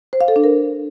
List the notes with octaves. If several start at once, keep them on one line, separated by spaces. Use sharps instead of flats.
C5
F5
A4
D4
A#4